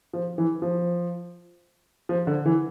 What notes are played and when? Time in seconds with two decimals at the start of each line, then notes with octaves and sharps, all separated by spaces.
0.14 F3
0.38 E3
0.62 F3
2.09 F3
2.27 D3
2.46 E3